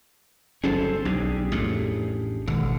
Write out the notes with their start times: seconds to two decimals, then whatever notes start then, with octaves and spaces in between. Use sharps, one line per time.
0.64 G1 F#3 C#4 G#4 A4 C5
1.05 B1 D4 G4 G#4
1.52 A1 F2 A2
2.48 G#1 B2 D3